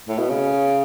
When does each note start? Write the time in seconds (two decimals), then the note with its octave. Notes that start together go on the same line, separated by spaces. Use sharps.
0.08 A2
0.19 B2
0.29 C#3